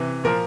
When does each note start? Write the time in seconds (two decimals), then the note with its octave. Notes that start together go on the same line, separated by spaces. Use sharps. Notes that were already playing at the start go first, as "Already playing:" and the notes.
Already playing: C3 E3
0.24 A#2 F3 A#4